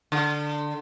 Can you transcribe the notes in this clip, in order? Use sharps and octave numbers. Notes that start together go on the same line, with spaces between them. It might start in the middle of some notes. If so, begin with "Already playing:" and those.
D3